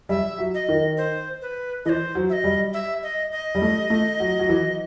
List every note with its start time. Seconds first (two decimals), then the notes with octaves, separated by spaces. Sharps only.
0.09 G3 E5
0.38 F#3
0.54 D#5
0.69 D#3
0.97 C5
1.42 B4
1.85 E3 C5 D#5
2.15 F#3
2.29 E5
2.33 D#5
2.44 G3
2.73 E5
3.03 D#5
3.32 D#5
3.55 G3
3.62 A3
3.90 A3
4.20 F#3
4.39 F#3
4.49 E3